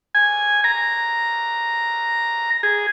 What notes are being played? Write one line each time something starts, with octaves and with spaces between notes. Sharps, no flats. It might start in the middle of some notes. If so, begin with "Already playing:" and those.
G#5
A#5
G#4